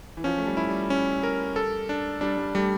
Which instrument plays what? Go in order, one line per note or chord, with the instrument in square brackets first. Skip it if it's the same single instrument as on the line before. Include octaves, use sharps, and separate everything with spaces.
[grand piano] E3
[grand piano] F3 [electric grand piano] C#4
[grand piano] A3
G3
[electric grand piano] E4
[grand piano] G3
[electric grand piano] C#4
A#4
A4
D4
[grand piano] G3 [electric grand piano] D4
[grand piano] G3
[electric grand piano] G3 [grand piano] A3